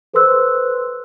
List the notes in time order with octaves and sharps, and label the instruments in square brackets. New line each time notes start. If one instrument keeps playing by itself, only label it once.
[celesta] A4 B4 C5 C6 E6 F#6